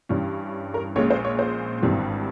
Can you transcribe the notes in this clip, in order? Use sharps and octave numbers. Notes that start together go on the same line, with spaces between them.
G2 E3 G3 C#4
A#4
A#1 A#2 G#3 C#4 C#5
C5
C#5
C5
G#1 G2 E3 G3 C4